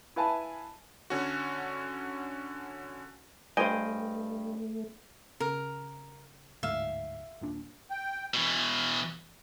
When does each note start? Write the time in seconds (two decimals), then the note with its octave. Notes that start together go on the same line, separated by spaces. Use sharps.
0.16 E4 B4 F5 G#5 A5 B5
1.10 D3 C#4 F#4
3.57 G2 A3 C5 D#5 G5 G#5
5.40 C#3 A#4
6.63 D1 D2 G#2 E5 F5
7.41 D#1 A#2 D4
7.90 G5
8.34 B2 E3